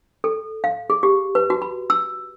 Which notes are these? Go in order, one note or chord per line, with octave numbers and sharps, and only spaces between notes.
A4
F5
G#4
G4
B4
F#4
B5
E6